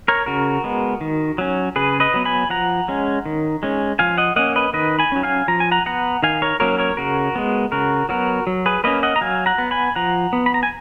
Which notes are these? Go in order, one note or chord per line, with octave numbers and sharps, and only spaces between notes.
A#4 C#5
C#3 F#4 A#4
G#3 B3
D#3
F#3 C#4
C#3 G#4 B4
B4 D#5
F#3 B3
G#5 B5
F3 F#5 A#5
G#3 C#4
D#3
G#3 C#4
F3 F5 G#5
D#5 F#5
A#3 C#4 D#5 F#5
B4 D#5
D#3 B4 D#5
G#5 B5
F#3 C#4
F5 G#5
F3 A#5
G#5
F#5 A#5
B3 F#5 A#5
D#3 F5 G#5
A#4 C#5
F#3 A#3 C#4 A#4 C#5
A#4 C#5
C#3 F#4 A#4
G#3 B3
C#3 F#4 A#4
F#3 B3 F#4 A#4
F#3
G#4 B4
A#3 C#4 B4 D#5
D#5 F#5
A#5
F#3 F5 G#5
F#5 A#5
B3
G#5 B5
F3 F#5 A#5
B3
B5
A#5
G#5